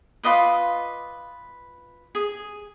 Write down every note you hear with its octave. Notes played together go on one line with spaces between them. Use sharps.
F4 B4 D#5 D6
G#4